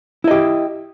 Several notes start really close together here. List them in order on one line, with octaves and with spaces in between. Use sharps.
E4 D#5 G4